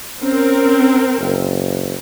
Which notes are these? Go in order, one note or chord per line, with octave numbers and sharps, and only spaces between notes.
C4 C#4 A#4
F#1